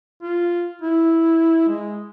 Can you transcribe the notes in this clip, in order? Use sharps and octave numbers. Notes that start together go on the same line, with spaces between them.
F4
E4
G#3